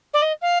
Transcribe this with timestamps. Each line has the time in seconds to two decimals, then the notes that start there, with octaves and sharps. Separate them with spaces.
0.14 D5
0.22 D#5
0.42 F5